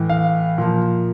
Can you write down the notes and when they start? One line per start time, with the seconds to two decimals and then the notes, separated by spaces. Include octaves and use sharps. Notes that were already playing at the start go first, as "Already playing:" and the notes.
Already playing: A2 E3
0.10 F5
0.58 A#2 F3